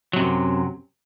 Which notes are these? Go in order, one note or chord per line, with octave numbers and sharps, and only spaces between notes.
F#2 C3 F#3